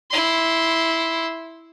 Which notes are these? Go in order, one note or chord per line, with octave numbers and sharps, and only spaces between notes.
E4 C6